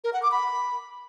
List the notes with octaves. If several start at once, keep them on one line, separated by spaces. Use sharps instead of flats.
A#4
F#5
D6
B5